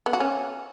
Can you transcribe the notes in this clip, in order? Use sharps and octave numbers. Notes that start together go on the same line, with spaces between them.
B3
F#4
C#4